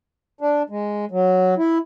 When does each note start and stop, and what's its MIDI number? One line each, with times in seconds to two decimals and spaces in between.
0.41 0.62 62
0.70 1.05 56
1.11 1.54 54
1.58 1.78 64